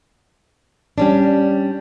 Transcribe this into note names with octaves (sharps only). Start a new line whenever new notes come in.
G3 C#4 D4